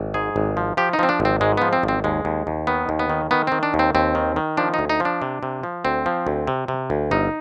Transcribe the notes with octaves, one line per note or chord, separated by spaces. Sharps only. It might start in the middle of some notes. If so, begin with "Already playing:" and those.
Already playing: G#1
G#2 G#4
G#1
F3
F3 G4
D#4
F3 C4
D4
G#1
C4
G#2 G#3
F3 B3
C4
G#1
C4
D#2 G#3
D#2
D#2
D#3 B3
D#2
B3
D#3
D#3 B3
D#3 C4
D4
D#2
C4
D#2 C4
D#3
D#3
F3 D4
D#4
D2
D#4
F3
D4
C3
C3
F3
D2 C4
F3
D2
C3
C3
D2
G1 D#4